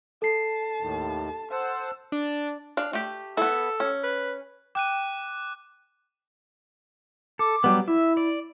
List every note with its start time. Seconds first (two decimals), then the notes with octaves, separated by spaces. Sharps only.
0.22 A4 A5 C7
0.81 D#2 A2 D#3
1.51 C5 F#5 A5 E6
2.12 D4
2.77 D4 F5
2.93 A3 G4
3.37 B3 E4 A4
3.80 C#4
4.03 B4
4.75 G5 D6 F#6 D#7
7.39 A4 D6
7.64 F#3 G3 B3
7.88 E4 E5
8.17 D5